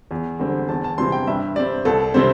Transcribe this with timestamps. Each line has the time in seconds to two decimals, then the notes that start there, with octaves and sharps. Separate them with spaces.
0.11 E2
0.39 D3 G3 C4
0.69 E2 A5
0.84 A5
0.98 C3 E3 G3 C4 C6
1.12 G5
1.27 G2 E5
1.56 G3 C4 D5
1.85 C2 A4
2.14 C3 G3 C4 C5